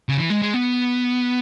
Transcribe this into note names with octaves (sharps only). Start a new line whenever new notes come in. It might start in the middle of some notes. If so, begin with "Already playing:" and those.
C#3
E3
G#3
G#3
B3